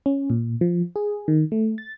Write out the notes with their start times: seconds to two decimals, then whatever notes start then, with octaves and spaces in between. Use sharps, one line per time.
0.06 C#4
0.30 A#2
0.61 F3
0.96 G#4
1.28 D#3
1.52 A3
1.78 A6